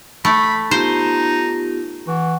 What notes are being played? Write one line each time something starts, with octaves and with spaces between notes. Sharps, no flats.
A3 B5
B3 D#4 F4 G4 C5
E3 F#5 C#6